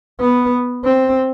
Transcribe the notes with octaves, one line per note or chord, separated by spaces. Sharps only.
B3
C4